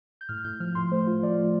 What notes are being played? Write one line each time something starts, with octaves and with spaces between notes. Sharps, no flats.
G6
A2 F6
A2 G6
F3 F6
A2 C6
A3 C5
F4
F3 D5
A3